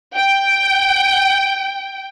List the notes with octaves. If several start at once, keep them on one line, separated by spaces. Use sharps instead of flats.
G5